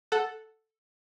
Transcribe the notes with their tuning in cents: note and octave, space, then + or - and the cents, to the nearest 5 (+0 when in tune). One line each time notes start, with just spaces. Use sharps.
A4 +0 F#5 +0